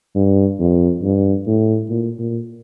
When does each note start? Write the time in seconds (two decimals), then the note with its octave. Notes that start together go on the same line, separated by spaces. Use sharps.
0.16 G2
0.59 F2
1.03 G2
1.47 A2
1.90 A#2
2.19 A#2